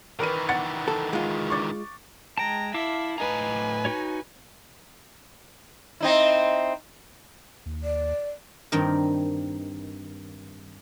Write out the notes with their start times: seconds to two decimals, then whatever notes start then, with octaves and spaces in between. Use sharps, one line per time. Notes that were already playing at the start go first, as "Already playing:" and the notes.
0.19 D#3 E3 A#4 B4 D#7
0.49 F#5 A6 C#7
0.88 A4
1.13 G#3 F4
1.50 C#6 D6 A6
2.38 G#3 G5 A5 A#5
2.74 E4 E5 F5 A5 D6
3.18 A2 B4 D#5 G#5 A#5
3.85 D#4 F#4 C#5
6.00 C4 D#4 E4
7.66 D#2
7.83 D5
8.72 G2 D#3 C4 A#4